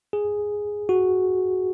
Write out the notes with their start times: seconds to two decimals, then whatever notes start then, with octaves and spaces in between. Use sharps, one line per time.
0.13 G#4
0.89 F#4